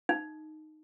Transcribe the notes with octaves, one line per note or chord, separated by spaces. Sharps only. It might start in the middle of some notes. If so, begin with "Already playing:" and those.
D#4